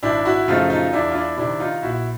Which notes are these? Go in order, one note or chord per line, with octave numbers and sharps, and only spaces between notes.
G#1 D4 E4
E4 F#4
F#2 C#3 F3 A3 D#4 F4
D#4 F4
E2 D4 E4
F4
D4 E4
C3 D#3 D4 E4
D#4 F4
A#1 E4 F#4